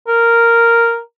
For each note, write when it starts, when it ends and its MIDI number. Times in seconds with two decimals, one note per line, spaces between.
0.08 1.00 70